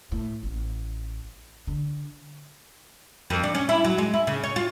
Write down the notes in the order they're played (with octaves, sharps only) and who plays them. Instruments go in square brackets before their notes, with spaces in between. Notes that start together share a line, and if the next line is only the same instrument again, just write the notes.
[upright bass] A2
A1
D3
[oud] F2
D4
C#4
E4
F#3
G#3
E4
C#3
C#5
F4